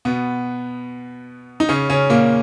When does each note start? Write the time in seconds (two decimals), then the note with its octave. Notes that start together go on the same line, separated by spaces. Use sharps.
0.05 B2 B3
1.60 D#4
1.69 C#3 C#4
1.90 C#3 C#4
2.10 A#2 A#3